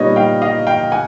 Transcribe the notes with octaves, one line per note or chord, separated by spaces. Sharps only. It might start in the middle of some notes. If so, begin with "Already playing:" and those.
Already playing: A#2 G3 B3 D#4 C#5 D#5
F5 G5
D#5 F5
F5 G5
F#5 G#5